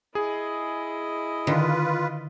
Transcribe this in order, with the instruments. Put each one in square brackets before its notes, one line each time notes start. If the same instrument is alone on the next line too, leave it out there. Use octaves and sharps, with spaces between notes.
[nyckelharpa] E4 D#5 [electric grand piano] G#4
[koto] D3 D#3 [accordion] F4 B4